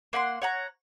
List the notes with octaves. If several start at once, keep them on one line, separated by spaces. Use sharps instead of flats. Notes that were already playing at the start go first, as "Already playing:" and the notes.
A#3 F#5 B5 C6
C#5 F#5 A#5